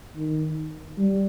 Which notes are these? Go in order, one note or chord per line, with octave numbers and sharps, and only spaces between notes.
D#3
G3